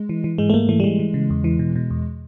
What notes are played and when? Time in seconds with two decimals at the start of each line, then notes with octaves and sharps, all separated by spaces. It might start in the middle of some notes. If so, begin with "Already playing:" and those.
Already playing: G#3
0.09 E3
0.24 E3
0.38 G#2 G#3
0.50 A3
0.54 G#2 A#3
0.69 E3 A3
0.80 G3
0.84 E3 G#3
0.99 E3
1.14 C#3
1.30 E2
1.44 E3
1.59 B2
1.76 B2
1.90 E2